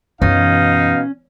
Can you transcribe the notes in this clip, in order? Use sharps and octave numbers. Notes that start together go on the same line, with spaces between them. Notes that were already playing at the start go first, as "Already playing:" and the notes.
F#2 B2 E3 C#4 D#4 F5